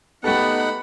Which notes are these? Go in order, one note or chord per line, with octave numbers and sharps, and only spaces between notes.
A3 B3 D#4 G4 A4 F#5 B5 F#6